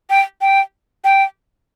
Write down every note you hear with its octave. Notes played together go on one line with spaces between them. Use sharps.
G5
G5
G5